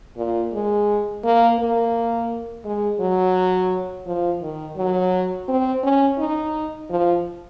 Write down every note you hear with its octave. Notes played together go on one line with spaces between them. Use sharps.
A#2
G#3
A#3
A#3
G#3
F#3
F3
D#3
F#3
C4
C#4
D#4
F3